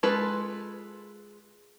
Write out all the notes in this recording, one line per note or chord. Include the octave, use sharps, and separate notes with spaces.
G#3 F4 A4 B4